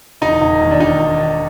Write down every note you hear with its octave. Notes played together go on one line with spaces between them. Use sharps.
E1 D#4
E1
D#2
D4
D#3 D#4